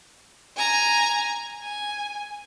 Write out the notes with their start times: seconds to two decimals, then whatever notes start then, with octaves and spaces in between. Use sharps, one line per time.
0.57 G#5 A#5
1.63 G#5